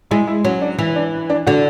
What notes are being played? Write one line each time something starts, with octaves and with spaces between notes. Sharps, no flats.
G#3 E4
E4
F#3 C#4
D4
E3 E4
D4
D4
D3 F#4